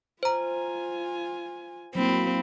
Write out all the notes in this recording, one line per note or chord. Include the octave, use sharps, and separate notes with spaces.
F4 C5 G#5 A#5
F#3 A#3 C4 E4 B5